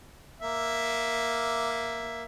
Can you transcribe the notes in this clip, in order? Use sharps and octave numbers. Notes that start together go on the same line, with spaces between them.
A#3 E5